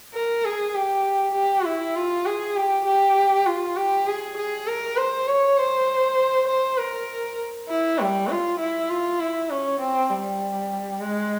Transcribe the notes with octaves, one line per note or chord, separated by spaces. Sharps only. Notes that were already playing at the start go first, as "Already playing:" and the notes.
A#4
G#4
G4
G4
E4
F4
G#4
G4
G4
F4
G4
G#4
G#4
A#4
C5
C#5
C5
C5
A#4
E4
G3
F4
E4
F4
E4
C#4
C4
G3
G#3